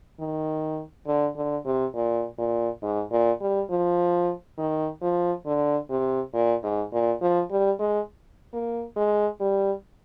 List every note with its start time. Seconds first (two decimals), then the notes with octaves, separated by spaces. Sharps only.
0.20 D#3
1.07 D3
1.36 D3
1.65 C3
1.95 A#2
2.38 A#2
2.82 G#2
3.11 A#2
3.41 G3
3.70 F3
4.58 D#3
5.02 F3
5.46 D3
5.90 C3
6.34 A#2
6.63 G#2
6.93 A#2
7.22 F3
7.51 G3
7.79 G#3
8.53 A#3
8.96 G#3
9.40 G3